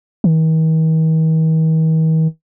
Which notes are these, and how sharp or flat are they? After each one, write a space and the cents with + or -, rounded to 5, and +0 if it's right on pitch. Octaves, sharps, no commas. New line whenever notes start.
D#3 +45